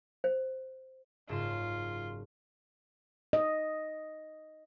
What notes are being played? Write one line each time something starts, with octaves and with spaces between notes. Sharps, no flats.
C5
F#1 G#2 F4 E7
D#5